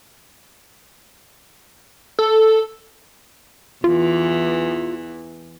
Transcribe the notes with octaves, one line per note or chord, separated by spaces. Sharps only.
A4
E2 E3 F4